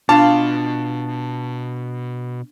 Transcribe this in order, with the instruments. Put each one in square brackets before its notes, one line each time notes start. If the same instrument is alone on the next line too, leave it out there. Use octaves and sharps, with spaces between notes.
[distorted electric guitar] B2 [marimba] D4 [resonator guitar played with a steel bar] F4 F5 [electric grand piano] A5